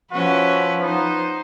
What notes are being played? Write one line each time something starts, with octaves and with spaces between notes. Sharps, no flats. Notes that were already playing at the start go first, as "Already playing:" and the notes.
F3 C#4 E4 F#4 B4
B3 D#4 C5